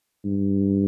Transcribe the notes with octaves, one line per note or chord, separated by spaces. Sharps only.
G2